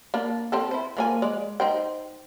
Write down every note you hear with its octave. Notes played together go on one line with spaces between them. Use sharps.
A#3 D4
C4 G4 A4
E4 C5
F3 A#3 G#5
G#3 D5
D#4 C5 G5